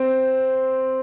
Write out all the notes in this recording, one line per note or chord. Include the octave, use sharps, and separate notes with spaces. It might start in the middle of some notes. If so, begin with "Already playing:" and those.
Already playing: C4